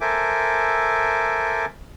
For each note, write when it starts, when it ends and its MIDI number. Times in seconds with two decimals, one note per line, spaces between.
0.01 1.66 69
0.01 1.66 70
0.01 1.66 72
0.01 1.66 76
0.01 1.66 80
0.01 1.66 86